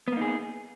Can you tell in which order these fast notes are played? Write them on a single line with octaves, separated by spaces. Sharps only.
B3 A#3 D#4 G#4